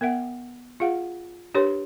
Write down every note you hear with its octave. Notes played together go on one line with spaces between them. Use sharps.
B3 A#4 E5 F#5
F4 G#4 F5 F#5
D4 G4 A#4 B4 C#5 C6